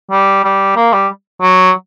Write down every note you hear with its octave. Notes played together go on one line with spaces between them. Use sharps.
G3
G3
A#3
G3
F#3